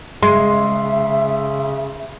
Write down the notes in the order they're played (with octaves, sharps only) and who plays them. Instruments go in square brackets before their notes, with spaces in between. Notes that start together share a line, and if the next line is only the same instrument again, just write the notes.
[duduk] C#3 [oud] G#3 [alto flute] E5 [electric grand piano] C6